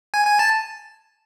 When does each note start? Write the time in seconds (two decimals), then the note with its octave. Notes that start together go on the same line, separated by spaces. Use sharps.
0.14 G#5
0.27 G#5
0.39 A5